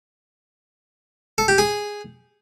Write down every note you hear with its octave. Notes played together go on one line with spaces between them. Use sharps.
A4
G4
G#4